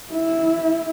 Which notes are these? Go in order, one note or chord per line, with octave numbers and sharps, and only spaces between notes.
E4